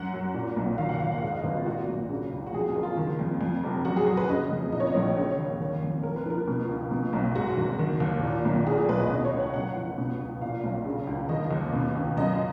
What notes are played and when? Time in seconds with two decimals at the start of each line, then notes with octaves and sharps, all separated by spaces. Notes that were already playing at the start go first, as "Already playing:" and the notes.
Already playing: F#2 F#5
0.13 F#3
0.34 A#2
0.56 B1
0.78 D#3 F5
0.89 F#5
1.00 D#2 F5
1.12 F#5
1.22 G#2 F5
1.33 D#5
1.44 G#1 B4
1.55 F4
1.66 A#2 F#4
1.88 B1
2.09 C#3
2.32 C#2
2.46 F#4
2.53 F2 G#4
2.69 G#4
2.75 F#1
2.83 F4
2.97 D#3
3.19 F2
3.41 F2
3.64 F1
3.85 F#2 F#4
3.97 G#4
4.06 F#3 F#4
4.17 B4
4.29 C#3 D#5
4.51 F2
4.72 A#2 D#5
4.80 C#5
4.87 D#5
4.95 A#1
5.17 C#3 C#5
5.38 D#2
5.60 D#3
5.82 F2
6.03 F2 A#4
6.16 B4
6.26 F3 A#4
6.48 B2
6.69 C#2
6.91 B2
7.13 B1
7.35 G#2 F#4
7.57 G#1
7.79 D#3
8.00 D#2
8.23 A#2
8.45 B1
8.67 A#2 G#4
8.78 G#4
8.89 B1 B4
8.99 D#5
9.10 B2 D#5
9.25 C#5
9.33 C#2
9.40 F#5
9.54 F#2 F#5
9.76 F3
9.98 B2
10.20 C#2
10.41 A#2 F5
10.64 B1
10.86 C#3
11.07 C#2
11.29 D#3 D#5
11.51 D#2
11.73 B2
11.95 C#2
12.17 F#2 D#5